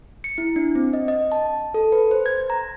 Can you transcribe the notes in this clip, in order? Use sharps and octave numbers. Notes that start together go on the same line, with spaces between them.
C#7
E4
D4
C4
D#5
D#5
A5
A4
B4
C5
G#6
A#5